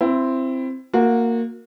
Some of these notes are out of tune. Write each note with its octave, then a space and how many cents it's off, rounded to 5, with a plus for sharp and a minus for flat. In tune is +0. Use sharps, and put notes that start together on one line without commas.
C4 +0 E4 +20
A#3 -10 F#4 -30